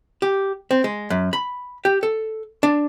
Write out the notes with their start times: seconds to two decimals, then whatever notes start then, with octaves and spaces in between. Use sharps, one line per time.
0.22 G4
0.71 C4
0.84 G#3
1.10 F#2
1.33 B5
1.85 G4
2.03 A4
2.63 D4